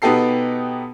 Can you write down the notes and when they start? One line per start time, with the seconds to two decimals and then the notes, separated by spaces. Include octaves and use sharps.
0.02 B2 B3 D#4 G4 A4 C7